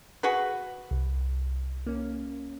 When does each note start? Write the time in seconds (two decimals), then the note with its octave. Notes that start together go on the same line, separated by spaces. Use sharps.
0.23 F#4 G#4 B4
0.91 C2
1.87 A#3 C#4